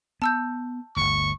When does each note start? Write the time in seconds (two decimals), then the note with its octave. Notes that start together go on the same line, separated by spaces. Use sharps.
0.22 B3 A5 E6 G6
0.96 G1 D2 C#6